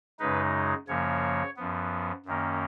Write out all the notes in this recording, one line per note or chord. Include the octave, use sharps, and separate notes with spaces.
F#2 C#3 G#3 D#4 B4
F#2 C#3 F3 A#3 C#5
F#2 F3 B3
F#2 D#3 A#3 C#4